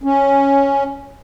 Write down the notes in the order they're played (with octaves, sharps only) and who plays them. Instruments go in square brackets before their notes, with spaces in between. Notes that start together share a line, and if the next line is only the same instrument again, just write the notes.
[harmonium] C#4